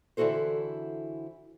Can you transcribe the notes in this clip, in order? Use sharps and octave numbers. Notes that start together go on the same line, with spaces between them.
D3 E3 E4 F#4 A4 C5